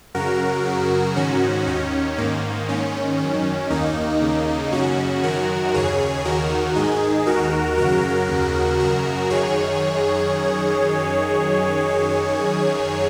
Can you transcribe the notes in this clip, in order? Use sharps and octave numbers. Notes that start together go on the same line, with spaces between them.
F#2 C#3 F#4 A#4
F#2 C#3
G#2 D#3 C#4 F#4
D#2 D#3 C#4
G#2 D#3 A#3
G#2 D#3 C#4
F#2 D#3
D#2 D#3 A#3 D#4
D#2 C#3
F#2 C#3 C#4 F#4
F#2 D#3 F#4 A#4
D#2 C#3 G#4 C#5
D#2 D#3 F#4 A#4
G#2 D#3 D#4 G#4
D#2 D#3 F#4 A#4
F#2 C#3 F#4 A#4
D#2 C#3
F#2 C#3 F#4 A#4
F#2 D#3 G#4 C#5